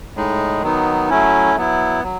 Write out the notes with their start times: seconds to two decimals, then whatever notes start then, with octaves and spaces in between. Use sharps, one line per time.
0.15 A2 G#3 D#4
0.63 D#3 F#3 B3 D#4
1.10 F#3 A3 C#4 E4
1.56 F#3 B3 E4
2.03 F#3